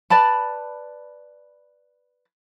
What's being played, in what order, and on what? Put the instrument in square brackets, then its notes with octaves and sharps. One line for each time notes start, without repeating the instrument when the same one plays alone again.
[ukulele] B4 D5 A5 B5